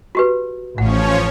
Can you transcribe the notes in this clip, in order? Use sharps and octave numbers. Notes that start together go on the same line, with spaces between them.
F#4 G4 B4
A1 F3 C#4 C#5 F#5